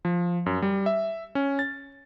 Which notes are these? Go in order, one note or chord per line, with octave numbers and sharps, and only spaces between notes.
F3
F#2
G3
E5
C#4
A6